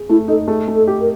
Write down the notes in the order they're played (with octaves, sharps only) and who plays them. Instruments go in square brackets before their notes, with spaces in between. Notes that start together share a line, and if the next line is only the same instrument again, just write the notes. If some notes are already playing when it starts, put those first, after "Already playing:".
Already playing: [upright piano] G#4
[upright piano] A3 [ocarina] E4
[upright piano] D#4 [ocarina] A4
[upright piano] A3 [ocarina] G#4
[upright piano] A3
[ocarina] A4
[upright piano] G4
[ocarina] A#4